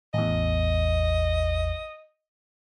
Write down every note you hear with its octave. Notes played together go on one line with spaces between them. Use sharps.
A1 E2 D#5